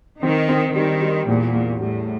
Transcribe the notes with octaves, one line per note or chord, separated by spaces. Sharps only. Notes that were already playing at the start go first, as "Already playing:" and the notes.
D#3 C4
C4
D#3 G3
G3
E2 A#2
E2
A2 G3